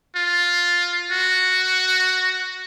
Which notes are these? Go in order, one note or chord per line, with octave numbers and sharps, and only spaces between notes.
F4
F#4